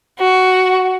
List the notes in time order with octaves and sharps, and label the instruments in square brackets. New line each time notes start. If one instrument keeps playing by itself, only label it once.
[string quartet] F#4